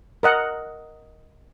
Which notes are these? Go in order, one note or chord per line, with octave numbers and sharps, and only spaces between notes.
A#4 D#5 F#5